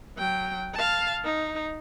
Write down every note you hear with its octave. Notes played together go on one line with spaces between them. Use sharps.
F#3 G5
F5 A5
D#4